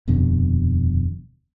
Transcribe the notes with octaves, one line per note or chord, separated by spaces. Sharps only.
D#1 F2 B2 D3